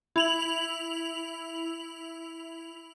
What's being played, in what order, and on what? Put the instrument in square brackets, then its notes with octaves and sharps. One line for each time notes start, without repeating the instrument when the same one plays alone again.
[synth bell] E4 F7 F#7